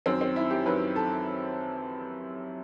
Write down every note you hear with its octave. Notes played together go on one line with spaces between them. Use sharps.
F#2 D#3 F#3 C4
C4
E4
G4
F#2 D#3 F#3 B4
A4